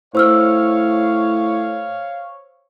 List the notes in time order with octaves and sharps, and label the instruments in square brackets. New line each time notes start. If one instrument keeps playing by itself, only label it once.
[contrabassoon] A2 [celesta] C5 E6 F6 [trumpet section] C#5 F5